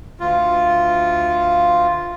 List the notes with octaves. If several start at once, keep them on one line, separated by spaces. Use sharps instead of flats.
D2 F4